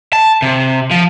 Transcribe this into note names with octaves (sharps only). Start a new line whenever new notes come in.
A5
C3
F3